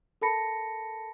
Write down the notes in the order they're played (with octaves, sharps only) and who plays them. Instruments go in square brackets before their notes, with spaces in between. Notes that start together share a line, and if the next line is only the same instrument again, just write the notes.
[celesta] A4 A#4 A5 B5 A#6 C#7